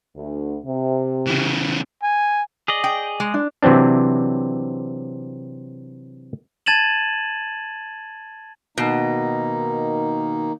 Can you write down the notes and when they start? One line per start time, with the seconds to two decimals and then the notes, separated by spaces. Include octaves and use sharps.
0.15 D2
0.64 C3
1.26 C#3 E3
2.02 G#5
2.68 G#4 D5 D#5
2.84 G5
3.20 G#3
3.34 D4
3.62 C3 E3 F#3 C4 D4
6.66 A5 G#6 A6 D#7 E7 F#7
8.78 B2 D#3 A#3 D#4